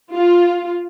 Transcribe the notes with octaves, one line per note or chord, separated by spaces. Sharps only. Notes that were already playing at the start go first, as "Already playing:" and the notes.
F4